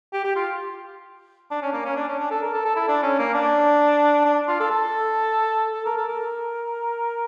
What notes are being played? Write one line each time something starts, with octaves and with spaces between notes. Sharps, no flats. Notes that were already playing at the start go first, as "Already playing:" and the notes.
G4
G4
F4
D4
C#4
A#3
C#4
D4
C#4
D4
A4
A#4
A4
A4
E4
D4
C#4
A#3
D4
D4
F4
A4
A4
A4
A#4
A4
A#4